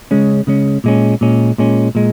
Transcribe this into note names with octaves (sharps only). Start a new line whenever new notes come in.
C#3 G#3 C#4
C#3 G#3 C#4
A#2 G#3 C#4
A#2 G#3 C#4
A#2 G#3 C#4
A#2 G#3